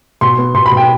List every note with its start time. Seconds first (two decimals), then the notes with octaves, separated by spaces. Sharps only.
0.21 B2 C6
0.38 B3
0.54 B2 C6
0.66 B5
0.71 B2
0.77 G5